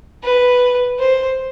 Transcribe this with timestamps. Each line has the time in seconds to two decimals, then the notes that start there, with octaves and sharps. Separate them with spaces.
0.23 B4
0.99 C5